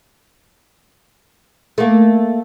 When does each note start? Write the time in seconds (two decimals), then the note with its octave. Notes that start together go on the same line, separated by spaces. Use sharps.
1.78 A3 A#3